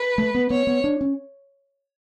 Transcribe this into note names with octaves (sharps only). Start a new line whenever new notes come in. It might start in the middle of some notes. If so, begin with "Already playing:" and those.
Already playing: B4
A3
B3
B3 C#5
B3
D4
C#4